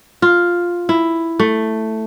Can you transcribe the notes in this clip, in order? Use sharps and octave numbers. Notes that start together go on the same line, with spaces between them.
F4
E4
A3